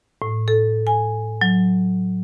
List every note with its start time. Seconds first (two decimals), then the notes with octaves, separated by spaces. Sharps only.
0.22 A2
0.48 A4
0.87 G#5
1.41 F#3